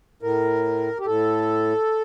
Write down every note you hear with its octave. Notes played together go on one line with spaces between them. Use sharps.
A2 A#4
G4
A2 A4